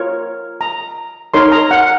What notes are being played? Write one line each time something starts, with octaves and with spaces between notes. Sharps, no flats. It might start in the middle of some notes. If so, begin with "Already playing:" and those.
Already playing: F4 A#4 C#5
A#5
D#4 A#4 C#5 C6
A#5
F#5